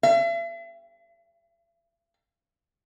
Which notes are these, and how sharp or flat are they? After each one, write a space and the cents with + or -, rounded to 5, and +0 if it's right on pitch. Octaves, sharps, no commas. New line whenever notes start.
E5 +40